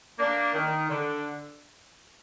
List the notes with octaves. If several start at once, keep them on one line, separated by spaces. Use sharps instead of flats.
A#3 D4
D#3
D3